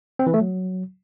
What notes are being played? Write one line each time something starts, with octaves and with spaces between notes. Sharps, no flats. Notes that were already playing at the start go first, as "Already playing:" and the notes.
C4
E3
A3
F#3